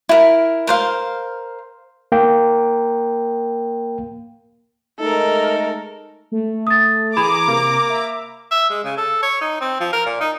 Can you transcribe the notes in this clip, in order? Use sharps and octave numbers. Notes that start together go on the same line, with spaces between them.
E4 A#4
A#4 C5 F5
A#3 G5
G#3 A3 D#4 A4 A#4
A3
D#6 A6
E3 G#4 A#5 B5 D6
C3 A#3
E5
E5
G#3
C#3
A4
C#5
D#4
C4
F3
A#4
A#2
D#4